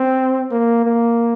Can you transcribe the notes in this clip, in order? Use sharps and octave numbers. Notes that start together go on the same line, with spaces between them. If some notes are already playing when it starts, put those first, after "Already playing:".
Already playing: C4
A#3
A#3